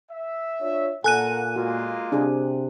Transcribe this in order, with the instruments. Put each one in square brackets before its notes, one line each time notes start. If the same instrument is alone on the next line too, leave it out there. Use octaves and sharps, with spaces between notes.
[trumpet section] E5
[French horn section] D4 F4 C#5
[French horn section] A#2 [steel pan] A4 [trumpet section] A#4 F#5 [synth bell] G#5 F#6 D#7
[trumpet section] G#3 A#3 F4 [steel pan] F#4
[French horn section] C3 [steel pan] D4 G#4